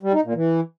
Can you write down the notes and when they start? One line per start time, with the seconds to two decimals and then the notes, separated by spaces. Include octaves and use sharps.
0.03 G3
0.14 D#4
0.24 A#2
0.35 E3